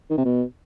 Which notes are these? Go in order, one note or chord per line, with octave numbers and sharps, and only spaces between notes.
D#3
C3
B2